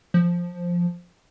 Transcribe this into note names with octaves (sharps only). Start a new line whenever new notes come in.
F3